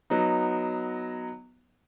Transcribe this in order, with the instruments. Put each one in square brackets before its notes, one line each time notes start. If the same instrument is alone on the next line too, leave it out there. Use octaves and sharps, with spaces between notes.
[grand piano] F#3 B3 D#4